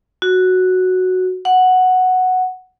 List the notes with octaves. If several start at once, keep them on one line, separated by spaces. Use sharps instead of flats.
F#4
F#5